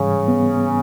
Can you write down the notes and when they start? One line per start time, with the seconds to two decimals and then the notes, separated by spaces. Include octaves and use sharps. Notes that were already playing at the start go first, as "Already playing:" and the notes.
Already playing: G#2 C#3 E3 G3
0.28 B3